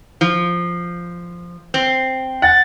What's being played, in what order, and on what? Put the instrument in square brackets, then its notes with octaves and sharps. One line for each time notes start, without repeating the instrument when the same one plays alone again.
[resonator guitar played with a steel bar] F3
C4
[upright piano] F#5 [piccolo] A6